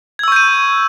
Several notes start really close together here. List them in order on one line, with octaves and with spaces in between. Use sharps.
G#6 E6 C#6 G6 D#7